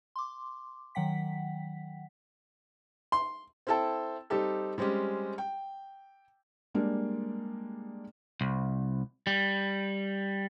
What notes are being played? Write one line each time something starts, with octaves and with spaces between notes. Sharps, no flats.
C6 D6
D#3 F#3 F#5 G5 B6
C6
C4 E4 A4 G5 A5
G3 C4 D#4 G4 A4
G3 G#3 C4 C#4 G4
G5
G3 G#3 A#3 D4
C2
G3